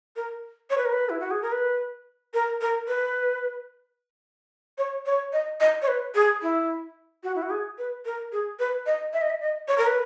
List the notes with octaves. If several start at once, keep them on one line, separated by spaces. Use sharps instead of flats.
A#4
C#5
B4
A#4
B4
E4
F#4
G#4
A#4
B4
A#4
A#4
B4
C#5
C#5
D#5
D#5
C#5
B4
G#4
E4
F#4
E4
F#4
G#4
B4
A#4
G#4
B4
D#5
E5
D#5
E5
D#5
C#5
A#4
B4